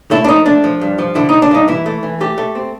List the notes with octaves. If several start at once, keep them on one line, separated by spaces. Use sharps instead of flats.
A3 E4
D4
F3 D#4
A3 D4
F3
G2
F3
D3 E4
D#4
D3
D4
G2 D#4
E3 E4
A3
E3
A3 G4
A3
C4